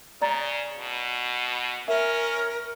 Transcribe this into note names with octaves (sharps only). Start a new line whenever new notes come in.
C#3 D5 A#5 A6
B2
C#4 A#4 E5